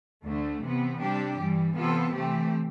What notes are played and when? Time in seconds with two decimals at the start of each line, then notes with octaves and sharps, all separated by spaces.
0.23 D2 D3 A3
0.61 C3 E3 B3
0.99 C3 G3 D4 G4
1.37 G2 E3 G3
1.75 C3 E3 B3 F4 A4
2.13 E3 A3 C4 G4